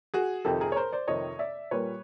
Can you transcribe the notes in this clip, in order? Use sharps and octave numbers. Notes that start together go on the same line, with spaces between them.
F#4 G#4
F2 C3 D#3 G4 A4
G#4 A#4
C#5
A#4 C5
C5 D5
F2 C3 D#3 C#5 D#5
D5 E5
A#2 G3 A#3 B4 C#5